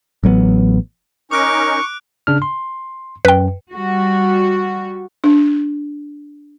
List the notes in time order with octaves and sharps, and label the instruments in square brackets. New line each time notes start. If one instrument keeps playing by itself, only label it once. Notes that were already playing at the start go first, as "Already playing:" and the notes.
[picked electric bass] A1 F#3 A3 B3
[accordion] C#4 D#4 A#4 [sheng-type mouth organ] C#6 [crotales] D6 F#6 D7
[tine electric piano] C#3 D4 F6
C6
[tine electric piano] F#2 [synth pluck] B4 G5
[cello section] G3 F#4
[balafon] D4